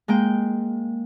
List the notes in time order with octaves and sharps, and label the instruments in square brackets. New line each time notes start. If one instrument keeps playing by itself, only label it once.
[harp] G#3 A#3 G5